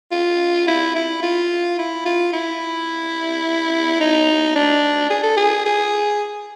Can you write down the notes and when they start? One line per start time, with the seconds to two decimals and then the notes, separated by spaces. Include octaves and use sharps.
0.12 F4
0.67 E4
0.95 E4
1.22 F4
1.78 E4
2.05 F4
2.33 E4
4.00 D#4
4.55 D4
5.10 G#4
5.23 A4
5.37 G#4
5.66 G#4